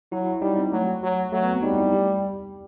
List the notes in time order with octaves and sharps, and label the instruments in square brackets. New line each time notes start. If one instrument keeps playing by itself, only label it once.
[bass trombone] F#3 [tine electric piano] E4
[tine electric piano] E4
[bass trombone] G3 [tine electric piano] D#4
[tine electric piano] C4
[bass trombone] F#3 [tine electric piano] A3
[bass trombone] F#3
[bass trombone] F#3 [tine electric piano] A3
[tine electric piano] B3
C4
[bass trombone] G3 [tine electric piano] D#4
[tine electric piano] E4
G4